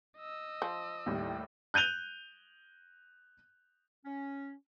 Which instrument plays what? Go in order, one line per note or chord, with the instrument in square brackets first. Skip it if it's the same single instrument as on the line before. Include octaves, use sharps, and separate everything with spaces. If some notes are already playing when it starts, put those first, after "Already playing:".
[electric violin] D#5 E6
[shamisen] F3
[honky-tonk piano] D#2 A2 G3
[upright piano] F#6 G6 D#7 F7 G7
[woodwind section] C#4